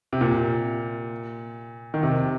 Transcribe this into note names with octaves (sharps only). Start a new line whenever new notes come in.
C3
A#2
D#3
C3